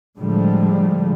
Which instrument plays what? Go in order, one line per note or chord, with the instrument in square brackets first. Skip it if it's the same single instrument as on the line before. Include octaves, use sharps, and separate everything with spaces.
[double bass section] A2 D3 F3 G3 G#3